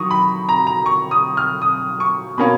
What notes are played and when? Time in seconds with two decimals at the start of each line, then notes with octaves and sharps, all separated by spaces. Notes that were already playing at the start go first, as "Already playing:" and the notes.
Already playing: D#3 F#3 C#6 D#6
0.11 B5
0.49 A#5
0.67 A#5
0.86 C#6
1.11 D#6
1.37 F6
1.62 D#6
2.00 C#6
2.37 B2 A#3 C#4 B5